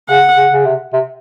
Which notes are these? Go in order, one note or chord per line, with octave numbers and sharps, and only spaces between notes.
C#3 F#5
C#3
C#3
C3
C3